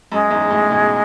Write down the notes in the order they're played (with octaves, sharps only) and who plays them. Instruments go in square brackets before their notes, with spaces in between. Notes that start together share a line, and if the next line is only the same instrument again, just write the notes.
[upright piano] F#2 [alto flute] G#3
[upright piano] E2 G#2
F#2 A2
G#2 B2